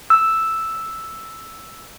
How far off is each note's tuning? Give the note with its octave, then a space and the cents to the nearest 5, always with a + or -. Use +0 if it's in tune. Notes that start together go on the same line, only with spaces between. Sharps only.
E6 +0